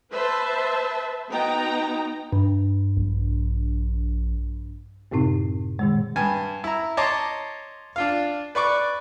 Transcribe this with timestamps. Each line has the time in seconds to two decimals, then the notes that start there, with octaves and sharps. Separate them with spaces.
0.12 B4 C5 E5 A5
1.30 B3 D#4 F#4 G5 A#5
2.33 G2
2.97 A#1
5.12 F#2 A2 C3 C4 D#4
5.79 A#2 D#3 G#3
6.16 G2 G#5
6.64 E4 A#5
6.97 C#5 D#5 A5 A#5 C6 D6
7.96 D4 F4 F5
8.55 B4 D5 C#6 D6